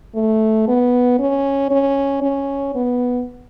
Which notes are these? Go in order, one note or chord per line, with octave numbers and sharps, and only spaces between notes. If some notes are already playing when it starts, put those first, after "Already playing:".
A3
B3
C#4
C#4
C#4
B3